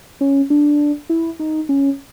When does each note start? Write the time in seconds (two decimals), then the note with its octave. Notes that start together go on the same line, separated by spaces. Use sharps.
0.21 C#4
0.50 D4
1.10 E4
1.39 D#4
1.69 C#4